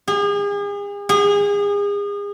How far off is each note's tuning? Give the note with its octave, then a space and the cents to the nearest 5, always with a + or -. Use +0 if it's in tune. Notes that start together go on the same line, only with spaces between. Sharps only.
G#4 -40
G#4 -35